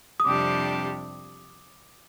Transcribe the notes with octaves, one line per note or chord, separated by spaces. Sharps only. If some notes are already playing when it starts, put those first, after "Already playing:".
D#6
F2 C3 G3 D4 G4 D6